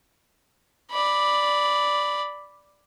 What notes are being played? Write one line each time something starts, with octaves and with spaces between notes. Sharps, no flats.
D5 B5